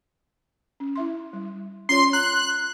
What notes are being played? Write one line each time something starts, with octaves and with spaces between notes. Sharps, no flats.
C#4
E4 E5 C6
G3
C#4 F4 C#5 C6
A#5 F#6